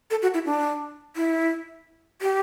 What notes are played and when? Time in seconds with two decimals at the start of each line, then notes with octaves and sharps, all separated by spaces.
0.11 A4
0.22 F#4
0.34 E4
0.45 D4
1.16 E4
2.22 G4